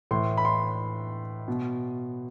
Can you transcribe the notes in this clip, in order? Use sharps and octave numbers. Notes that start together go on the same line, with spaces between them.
A2 E3 C6
B5
C6
B2